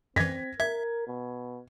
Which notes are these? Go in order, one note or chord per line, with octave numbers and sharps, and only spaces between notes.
F#2 E3 C4 G#6 A#6 B6
A#4 E5 G#6
B2